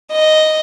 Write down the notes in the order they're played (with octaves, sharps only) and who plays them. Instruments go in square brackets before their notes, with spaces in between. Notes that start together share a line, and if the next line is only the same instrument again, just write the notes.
[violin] D#5